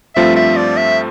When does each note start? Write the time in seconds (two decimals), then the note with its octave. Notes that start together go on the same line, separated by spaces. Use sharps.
0.16 G2 F3 A3 C4 F4 E5
0.36 E5
0.57 D5
0.77 E5